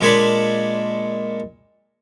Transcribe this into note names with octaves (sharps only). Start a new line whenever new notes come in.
A#2 G#3 D4 C#5 A5 B5